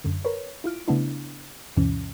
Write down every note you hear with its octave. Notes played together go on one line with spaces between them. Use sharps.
F#2 D3
A#4 B4 C#5
E4 F4 F6 D7
C#3 A3 B3 D4 E4
D2 G2 B2 E3 C#4